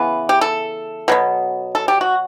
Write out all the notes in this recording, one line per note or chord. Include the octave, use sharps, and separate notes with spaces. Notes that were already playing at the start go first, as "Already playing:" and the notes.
Already playing: C#3 E3 B3 B4
G4
A4
B2 F#3 B3
A4
G4
F#4